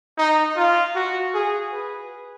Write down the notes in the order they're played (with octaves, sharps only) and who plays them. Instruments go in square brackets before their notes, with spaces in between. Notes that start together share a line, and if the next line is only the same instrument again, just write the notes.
[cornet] D#4
F4
F#4
G#4
B4